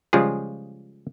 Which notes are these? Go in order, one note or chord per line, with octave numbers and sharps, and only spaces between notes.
C#3 F3 G3 G#3 F4 G#4